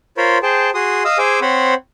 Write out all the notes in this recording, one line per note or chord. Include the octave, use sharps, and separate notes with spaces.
F4 A#4 C5 C#5 B5
G#4 C5 G5 A5
F#4 G#4 C6 D#6
D#5 F5 D#6 E6
G#4 C5 G#5 D6 E6
C4 C5 C#5 F#5 B5